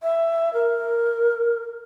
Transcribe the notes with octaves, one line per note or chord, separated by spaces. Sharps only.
E5
A#4